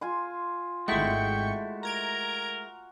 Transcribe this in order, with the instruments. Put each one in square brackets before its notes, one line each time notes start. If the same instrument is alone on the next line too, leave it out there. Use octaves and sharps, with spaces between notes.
[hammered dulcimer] F4 G#5 C6
[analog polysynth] G#1 C#6 [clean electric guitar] G#3 A3 E4 [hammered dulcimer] F#4 [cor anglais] G5
[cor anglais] A#4 [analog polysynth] A#5 G#6 D7